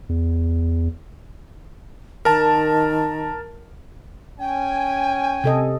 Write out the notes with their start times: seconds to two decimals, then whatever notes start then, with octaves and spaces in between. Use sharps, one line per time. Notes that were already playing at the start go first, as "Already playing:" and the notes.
0.09 E2
2.25 D#3 A#4 A5
4.40 C#4 G5 G#5
5.44 C3 A4 D#5